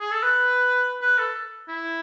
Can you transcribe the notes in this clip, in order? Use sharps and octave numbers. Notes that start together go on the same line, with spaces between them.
G#4
A4
B4
B4
A4
E4